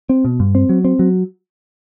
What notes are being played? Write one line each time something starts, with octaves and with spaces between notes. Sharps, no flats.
C4
B2
G2
C4
F#3
C4
F#3